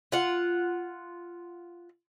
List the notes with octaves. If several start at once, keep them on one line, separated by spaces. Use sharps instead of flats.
F4 F#5